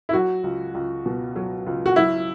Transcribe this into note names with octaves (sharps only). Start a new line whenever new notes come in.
E4
F#3 F#4
C#2
C#2
B2
F#3
C#2
F#4
F#3 E4